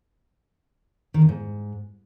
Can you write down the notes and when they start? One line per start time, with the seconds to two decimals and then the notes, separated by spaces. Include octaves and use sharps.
1.14 D#3
1.21 E2
1.29 G#2